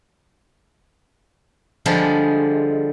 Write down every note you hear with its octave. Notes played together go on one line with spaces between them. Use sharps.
D3 F3 G3 G#3